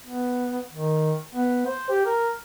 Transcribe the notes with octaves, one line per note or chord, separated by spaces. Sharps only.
B3
D#3
B3
C5
G4
A#4